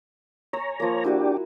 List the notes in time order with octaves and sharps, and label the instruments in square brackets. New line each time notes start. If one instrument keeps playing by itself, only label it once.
[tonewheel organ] C#5 A#5 [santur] G#5 E6
[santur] F3 A#3
[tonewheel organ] D4 G4 [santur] E4 F#4 B4